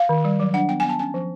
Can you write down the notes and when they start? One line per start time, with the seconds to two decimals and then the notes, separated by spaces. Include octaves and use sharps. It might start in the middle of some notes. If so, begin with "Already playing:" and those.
Already playing: F5
0.09 D#3
0.25 G3
0.40 F#3
0.54 D4 F#5
0.69 B3 G5
0.80 B3 G#5
0.89 A5
0.99 C#4 G#5
1.14 F3